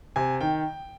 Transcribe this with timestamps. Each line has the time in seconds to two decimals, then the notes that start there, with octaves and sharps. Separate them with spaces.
0.16 C3 G#5
0.41 D#3 G5